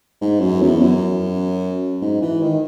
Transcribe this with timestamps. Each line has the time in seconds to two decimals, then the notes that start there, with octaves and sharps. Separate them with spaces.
0.21 G#2
0.40 F#2
0.61 E2
0.81 F#2
2.02 G#2
2.22 E3
2.42 D#3